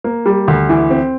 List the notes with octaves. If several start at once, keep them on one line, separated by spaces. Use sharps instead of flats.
A#3
G3
D2
E3
C4